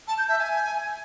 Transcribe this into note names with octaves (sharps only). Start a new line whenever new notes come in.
A5
G6
E5
G#5